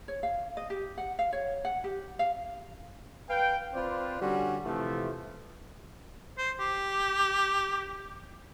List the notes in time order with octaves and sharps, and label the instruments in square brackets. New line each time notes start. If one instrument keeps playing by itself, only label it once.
[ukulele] C#5
F5
D#5
G4
F#5
F5
C#5
F#5
G4
F5
[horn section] B4 F5 G5
C4 F4 B4 C5 D5
D3 G3 C#4 F#4
C3 E3 F3 A3
[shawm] C5
G4